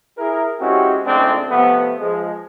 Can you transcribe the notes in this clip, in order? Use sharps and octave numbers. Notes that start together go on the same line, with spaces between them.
E4 G#4 A#4
G#3 C4 C#4 E4 F#4 G4
F2 A2 C#3 G#3 C4 D4
C3 F3 A3 B3
F3 G#3